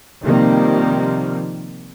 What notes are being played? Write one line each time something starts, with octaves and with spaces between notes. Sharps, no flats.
C3 D#3 F3 G3 A#3 C4